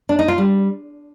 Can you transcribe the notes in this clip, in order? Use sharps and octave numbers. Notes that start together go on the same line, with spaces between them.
D4
D#4
F4
G3